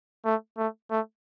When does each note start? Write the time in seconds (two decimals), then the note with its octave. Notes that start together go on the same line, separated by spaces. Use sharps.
0.25 A3
0.57 A3
0.90 A3